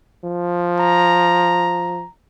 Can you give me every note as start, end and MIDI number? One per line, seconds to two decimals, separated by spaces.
0.24 2.04 53
0.80 2.10 82